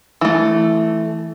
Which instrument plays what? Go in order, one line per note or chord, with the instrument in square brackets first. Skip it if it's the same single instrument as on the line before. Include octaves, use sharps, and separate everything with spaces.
[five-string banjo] E3 A3